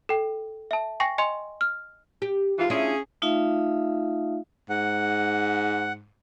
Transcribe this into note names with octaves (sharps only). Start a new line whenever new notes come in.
A4 G5
E5 A5
G5 G#5 C#6 A#6
D#5 G#5 C6
F6
G4
G#2 E3 F4
C#4 D4 E4 F4 G#4
A3 D#4 F4 E5 F5
G#2 F#5